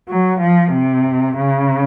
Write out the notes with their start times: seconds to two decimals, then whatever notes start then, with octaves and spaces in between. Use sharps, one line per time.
0.09 F#3
0.40 F3
0.72 C3
1.37 C#3